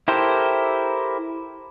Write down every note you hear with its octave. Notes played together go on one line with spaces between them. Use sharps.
E4 G4 A4 A#4 C5